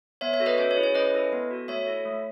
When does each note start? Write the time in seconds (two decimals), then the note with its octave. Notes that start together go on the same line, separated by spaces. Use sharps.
0.21 B3 C#5 E5
0.33 C#5 E5
0.40 F#4 A4
0.46 B4 D#5
0.58 C#4 C#5
0.71 C#5
0.77 E4 G#4
0.83 C#5
0.95 C#4 B4 D#5
1.14 E4 A4
1.33 B3
1.51 F#4 A4
1.68 A3 C#5 E5
1.87 E4 A4
2.05 A3